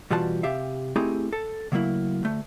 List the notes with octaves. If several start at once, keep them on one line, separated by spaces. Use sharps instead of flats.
B2 E3 G3 F4 F#4 A5
C3 G4 E5 F5
A3 C4 D#4 E4 G4 G#4
A4
C#3 F#3 A3 A#3 E4
D2 A3